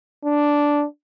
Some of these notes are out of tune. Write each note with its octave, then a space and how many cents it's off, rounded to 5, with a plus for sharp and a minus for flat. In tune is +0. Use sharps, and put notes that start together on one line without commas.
D4 -5